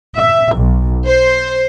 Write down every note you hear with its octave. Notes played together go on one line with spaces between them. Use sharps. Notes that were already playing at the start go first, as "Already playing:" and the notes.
E5
B1
C5